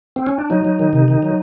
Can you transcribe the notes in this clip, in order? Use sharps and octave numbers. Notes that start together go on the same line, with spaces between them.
C4
C#4
D4
F#3 D#4
F#3
D#3
C3
D#3
F#3